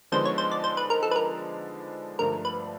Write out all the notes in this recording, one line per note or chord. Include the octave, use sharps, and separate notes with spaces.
D3 F3 G#3 B3 D#4 C5
C#5
C5
D5
C5
B4
A#4
A4
B4
A#4
G2 D3 F3 A3 A#4
B4